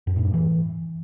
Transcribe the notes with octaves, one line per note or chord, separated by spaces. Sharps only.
F#2
A2
G2
E3